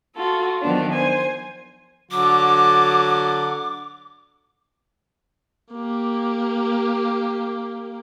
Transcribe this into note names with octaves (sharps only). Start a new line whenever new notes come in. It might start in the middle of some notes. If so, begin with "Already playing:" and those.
F4 F#4 A4
D#3 F3 F#3 B3 D4 F4
C5 G#5
D3 F#3 F#4 D6
A#3 G4